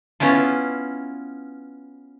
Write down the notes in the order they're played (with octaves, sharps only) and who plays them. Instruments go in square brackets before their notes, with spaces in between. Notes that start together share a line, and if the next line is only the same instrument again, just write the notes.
[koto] B3 C#4 E4 F4